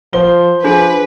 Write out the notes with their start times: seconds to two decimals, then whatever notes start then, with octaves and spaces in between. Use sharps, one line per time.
0.13 F3 C5 G7
0.64 F3 D4 F4 G#4 B4